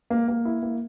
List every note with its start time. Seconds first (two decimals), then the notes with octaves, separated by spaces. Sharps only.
0.10 A#3
0.28 A#3
0.45 E4
0.63 A#3